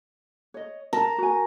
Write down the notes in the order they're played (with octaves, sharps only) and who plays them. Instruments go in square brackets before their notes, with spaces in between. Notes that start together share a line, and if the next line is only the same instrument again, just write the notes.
[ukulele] C#5 D#5
[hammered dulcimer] A#4 [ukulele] A5
[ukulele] F#4 G#5